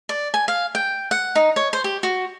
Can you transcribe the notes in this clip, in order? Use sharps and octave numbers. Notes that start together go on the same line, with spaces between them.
D5
G#5
F5
G5
F#5
D#4
C#5
C5
G4
F#4